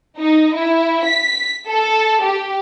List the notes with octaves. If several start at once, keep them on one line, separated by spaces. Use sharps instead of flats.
D#4
E4
B6
A4
G4